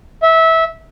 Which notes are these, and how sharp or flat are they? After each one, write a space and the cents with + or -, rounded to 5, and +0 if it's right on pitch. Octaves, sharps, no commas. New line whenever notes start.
E5 -20